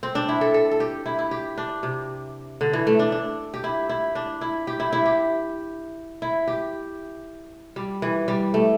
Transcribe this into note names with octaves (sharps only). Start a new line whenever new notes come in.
C4
D4
E4
A4
A4
A4
G4
E4
E4
G4
D4
C3
D3
E3
A3
D4
D4
G4
E4
E4
D4
E4
G4
E4
E4
G4
E4
G4
G3
E3
G3
A3